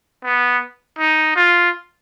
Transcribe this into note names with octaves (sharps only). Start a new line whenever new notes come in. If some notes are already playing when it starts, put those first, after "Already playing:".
B3
D#4
F4